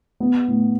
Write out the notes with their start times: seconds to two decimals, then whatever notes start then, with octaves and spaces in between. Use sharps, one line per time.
0.20 B3
0.48 A2